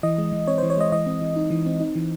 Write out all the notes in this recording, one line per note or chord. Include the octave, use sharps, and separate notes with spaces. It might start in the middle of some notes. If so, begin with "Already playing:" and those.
E3 D#5
G#3
E3
C4 C#5
E3 C5
C#5
G#3 D#5
E3 D#5
C4
E3
D#4
E3
C4
D#4
E3